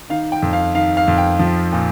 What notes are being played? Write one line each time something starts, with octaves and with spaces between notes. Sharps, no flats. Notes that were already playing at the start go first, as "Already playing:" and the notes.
D#3 F5
G5
F2
F5
D#3 F5
F5
F2
G5
F3
A#2